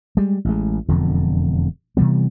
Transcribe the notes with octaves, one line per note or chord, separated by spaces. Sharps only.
G3 G#3
A1 G#3
E1 F2 D3
C3 E3 G3 B3